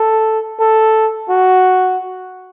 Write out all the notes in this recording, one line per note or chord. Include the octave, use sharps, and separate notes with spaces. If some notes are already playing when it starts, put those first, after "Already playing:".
Already playing: A4
A4
F#4